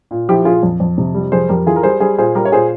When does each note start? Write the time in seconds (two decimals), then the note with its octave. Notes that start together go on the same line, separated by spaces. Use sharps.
0.11 A#2
0.29 F3 E4 G4
0.45 A#2 F4 G#4
0.63 F2
0.80 F2
0.98 C3
1.15 G3
1.32 F2 G#4 C5
1.49 F2 G4 A#4
1.66 E3 F4 G#4
1.76 A#4
1.83 G3 G#4 C5
2.00 G3 G#4 C5
2.18 A#2 G#4 C5
2.35 G3 G4 A#4
2.45 C#5
2.52 A#2 G#4 C5